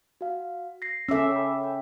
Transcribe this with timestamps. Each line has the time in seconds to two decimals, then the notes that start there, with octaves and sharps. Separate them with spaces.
0.21 F#4 F5
0.82 A#6 C7
1.09 C#4 A4 E5 D6 E6
1.32 G5 B5
1.64 G5